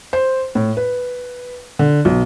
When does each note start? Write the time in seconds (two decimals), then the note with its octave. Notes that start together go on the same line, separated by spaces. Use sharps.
0.13 C5
0.55 A2
0.77 B4
1.79 D3
2.05 B1